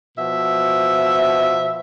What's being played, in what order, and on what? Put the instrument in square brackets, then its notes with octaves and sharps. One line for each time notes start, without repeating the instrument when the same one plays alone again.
[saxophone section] B2 F3 E5